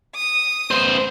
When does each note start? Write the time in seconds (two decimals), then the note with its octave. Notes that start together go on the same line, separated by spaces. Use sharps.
0.15 D#6
0.71 B3 C5